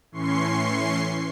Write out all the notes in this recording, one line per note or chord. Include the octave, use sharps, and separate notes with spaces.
A2 E3 C#4 C6 C#6 C7